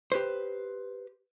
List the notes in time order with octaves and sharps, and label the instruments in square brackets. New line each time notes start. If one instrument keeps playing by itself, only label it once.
[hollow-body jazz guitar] G4 B4 C5